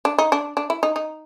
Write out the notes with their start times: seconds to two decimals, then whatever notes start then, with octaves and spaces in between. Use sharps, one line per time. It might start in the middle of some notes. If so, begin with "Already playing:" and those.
0.05 D4
0.18 D#4
0.32 D4
0.57 D4
0.70 E4
0.83 D#4
0.96 D#4